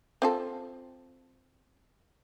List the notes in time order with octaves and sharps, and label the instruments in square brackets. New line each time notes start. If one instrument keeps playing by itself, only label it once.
[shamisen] C4 F4 A4